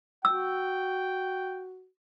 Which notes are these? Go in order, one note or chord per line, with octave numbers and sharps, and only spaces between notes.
F#4 G5 E6